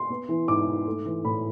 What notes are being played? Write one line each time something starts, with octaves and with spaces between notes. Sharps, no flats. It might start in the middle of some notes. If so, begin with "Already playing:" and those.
Already playing: C6
B3
E3
G#2 D6
G#2
A3
E3
A2 B5